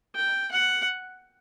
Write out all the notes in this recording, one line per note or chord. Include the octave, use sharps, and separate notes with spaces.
G5
F#5